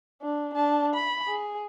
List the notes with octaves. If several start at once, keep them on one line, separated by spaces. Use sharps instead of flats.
D4
D4 A5
B5
G#4